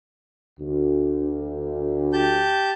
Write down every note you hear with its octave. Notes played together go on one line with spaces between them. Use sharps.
D2
G4 A5 G6